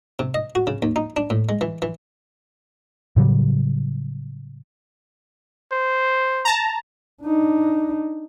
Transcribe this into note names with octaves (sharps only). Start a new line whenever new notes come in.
C3
D#5
F#4
C#3
D#2
D#4
D4
A2
G#3
E3
E3
A2 C#3 F#3 G3
C5
A5 A#5
D4 D#4